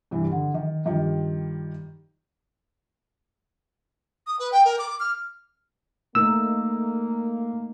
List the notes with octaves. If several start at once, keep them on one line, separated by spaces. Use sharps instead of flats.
G2 C3 E3
D3
D#3
G2 D#3 F3 G4
D#6
B4
G5
A#4
D6
F6
A3 A#3 D#4 A#4 E6